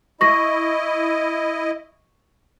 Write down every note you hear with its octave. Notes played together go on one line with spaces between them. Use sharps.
E4 D#5 C#6 A#6